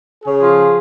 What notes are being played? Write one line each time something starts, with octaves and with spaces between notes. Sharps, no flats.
C#3 G#4
F3